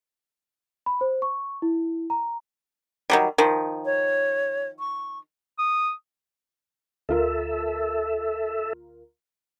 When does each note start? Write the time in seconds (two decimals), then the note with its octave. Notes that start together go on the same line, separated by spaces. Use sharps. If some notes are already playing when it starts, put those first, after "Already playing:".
0.86 B5
1.01 C5
1.22 C#6
1.62 E4
2.10 A#5
3.10 D#3 F#3 G3
3.38 D#3 F3
3.85 C#5
4.79 C#6
5.59 D#6
7.09 D2 F4 A4 A#4 E5